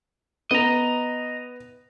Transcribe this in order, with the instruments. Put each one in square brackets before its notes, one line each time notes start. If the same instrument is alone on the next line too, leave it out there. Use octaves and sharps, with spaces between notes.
[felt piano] B3 [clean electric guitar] D#5 A#5